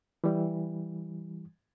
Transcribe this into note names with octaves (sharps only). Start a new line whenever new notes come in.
E3 G3